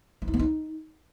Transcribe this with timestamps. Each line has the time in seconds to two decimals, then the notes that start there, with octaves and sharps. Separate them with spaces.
0.22 C#4
0.28 E4
0.34 B3
0.39 D#4